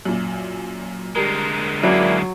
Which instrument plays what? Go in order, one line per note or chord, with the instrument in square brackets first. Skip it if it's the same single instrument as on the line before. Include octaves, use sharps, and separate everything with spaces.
[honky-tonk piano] F#2 A#2
[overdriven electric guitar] D3 G#3 [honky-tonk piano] G3 A#4
[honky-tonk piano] F#2 [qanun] F#3 [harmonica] A#3 D4 E4